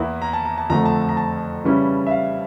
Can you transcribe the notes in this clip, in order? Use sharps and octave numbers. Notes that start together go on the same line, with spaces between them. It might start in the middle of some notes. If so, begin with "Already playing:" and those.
Already playing: E2 E3 A#3 E4
A#5
A5
A#5
A5
F2 D3 F3 A3 A#5
A5
A5
A#5
A5
C#3 E3 G3 C#4 E4
E5
F5